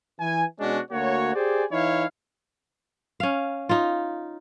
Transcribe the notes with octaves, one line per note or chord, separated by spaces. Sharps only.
E3 G#5
B2 G#3 C#4 D4 F#4
D2 A#3 F#4 C#5
G4 G#4 C5 D5 G#5
E3 D#4 E4 C#5 F5
C#4 F5
D#4 F4